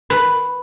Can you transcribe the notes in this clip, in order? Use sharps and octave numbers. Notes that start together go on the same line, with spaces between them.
B4